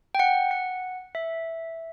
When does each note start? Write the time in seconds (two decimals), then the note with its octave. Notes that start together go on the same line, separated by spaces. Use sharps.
0.15 G5
0.19 F#5
0.51 F#5
1.15 E5